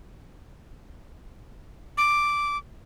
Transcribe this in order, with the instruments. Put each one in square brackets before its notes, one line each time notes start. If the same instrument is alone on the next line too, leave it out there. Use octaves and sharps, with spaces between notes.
[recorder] D6